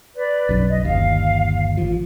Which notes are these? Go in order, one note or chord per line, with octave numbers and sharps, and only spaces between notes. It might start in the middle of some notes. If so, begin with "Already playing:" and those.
B4 D5
B1 F#2
D#5
G1 D#2 F5
A1 F3